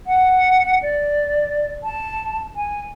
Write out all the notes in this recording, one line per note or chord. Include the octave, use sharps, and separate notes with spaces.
F#5
D5
A5
G#5